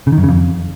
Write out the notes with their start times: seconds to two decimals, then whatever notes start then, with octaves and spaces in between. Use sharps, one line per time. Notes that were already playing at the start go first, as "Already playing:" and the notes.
0.07 C#3
0.12 D#3
0.18 F#2
0.23 C#3
0.29 F2